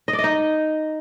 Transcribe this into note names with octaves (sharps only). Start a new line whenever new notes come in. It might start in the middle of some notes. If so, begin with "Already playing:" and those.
D#5
D5
D#5
D#4